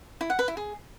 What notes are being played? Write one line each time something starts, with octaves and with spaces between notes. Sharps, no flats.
E4
F#5
B4
E4
G#4